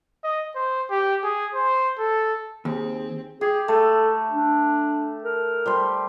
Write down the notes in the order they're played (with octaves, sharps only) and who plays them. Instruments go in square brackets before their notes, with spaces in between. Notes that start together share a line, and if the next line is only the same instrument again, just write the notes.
[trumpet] D#5
C5
G4
G#4
C5
A4
[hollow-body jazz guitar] D#2 [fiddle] C4 [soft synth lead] G#4
[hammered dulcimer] G4 [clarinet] G#4
[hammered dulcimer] A3 [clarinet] A4
[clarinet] D4
A#4
[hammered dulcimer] G3 C5 C6